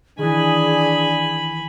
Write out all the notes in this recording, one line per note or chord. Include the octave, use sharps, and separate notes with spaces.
D#3 E3 D4 G#4 G#5 B5